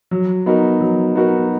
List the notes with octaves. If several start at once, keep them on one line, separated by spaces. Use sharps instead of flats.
F#3
B3 D#4 F#4 A#4
F#3
B3 D#4 F#4 A#4